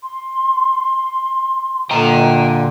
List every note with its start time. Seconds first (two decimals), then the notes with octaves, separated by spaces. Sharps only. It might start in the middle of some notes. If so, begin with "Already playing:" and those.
0.03 C6
1.91 A#2 D3 G5 A#5